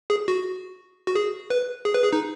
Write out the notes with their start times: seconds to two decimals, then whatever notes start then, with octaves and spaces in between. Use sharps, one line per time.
0.10 G#4
0.28 F#4
1.07 F#4
1.15 G#4
1.50 B4
1.85 G#4
1.94 B4
2.04 G#4
2.13 D#4